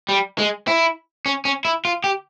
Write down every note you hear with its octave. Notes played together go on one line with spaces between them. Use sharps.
G3
G#3
E4
C#4
C#4
E4
F4
G4